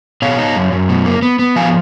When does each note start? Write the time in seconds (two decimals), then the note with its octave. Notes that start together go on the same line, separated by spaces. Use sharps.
0.22 B2 C#5 F5
0.39 D#4
0.56 F#2
0.72 F#2
0.89 B2
1.06 A#3
1.22 B3
1.39 B3
1.56 F3 F5 G#5